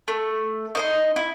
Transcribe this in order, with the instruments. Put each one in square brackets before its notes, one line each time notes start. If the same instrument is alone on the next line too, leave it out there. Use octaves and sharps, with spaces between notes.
[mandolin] A3
D#4 D#5 C6
E4